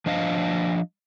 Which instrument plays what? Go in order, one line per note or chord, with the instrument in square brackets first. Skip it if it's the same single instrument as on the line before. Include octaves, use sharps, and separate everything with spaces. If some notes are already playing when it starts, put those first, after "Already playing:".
[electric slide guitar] F3 D4 D#5 F5